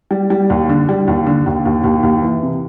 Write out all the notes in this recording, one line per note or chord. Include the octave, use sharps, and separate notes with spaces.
G3
G3
D#2
D3
G3
D#2
D3
D#2
D#2
D#2
D#2
E3
C3